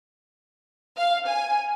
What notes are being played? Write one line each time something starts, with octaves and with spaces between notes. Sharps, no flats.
F5
G#5